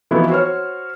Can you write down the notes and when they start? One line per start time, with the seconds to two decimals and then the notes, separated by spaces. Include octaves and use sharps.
0.11 E3 F3 B3 D#4 E4 F#4
0.29 F#4 C5 C#5 F6